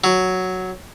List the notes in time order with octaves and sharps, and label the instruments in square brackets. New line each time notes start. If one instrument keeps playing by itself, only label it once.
[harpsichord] F#3